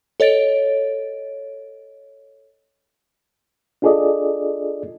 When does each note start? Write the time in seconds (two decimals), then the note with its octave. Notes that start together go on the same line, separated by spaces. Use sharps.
0.20 A4 C#5 D#5 A6 D7
3.82 D4 F4 G#4 A4 D5 D#5